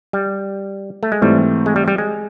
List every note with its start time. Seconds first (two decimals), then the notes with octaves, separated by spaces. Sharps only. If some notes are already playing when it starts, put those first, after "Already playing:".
0.13 G3
1.03 A3
1.12 G#3
1.22 G#2 E3 G3 A3 C4
1.66 G#3
1.76 G3
1.88 G3
1.98 G#3